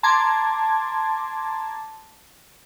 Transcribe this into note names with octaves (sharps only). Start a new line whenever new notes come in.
A5 A#5 C6 D6 G#6